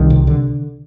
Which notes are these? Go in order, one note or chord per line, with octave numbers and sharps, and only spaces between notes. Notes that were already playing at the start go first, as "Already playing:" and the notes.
Already playing: C2 D#3
C3
D3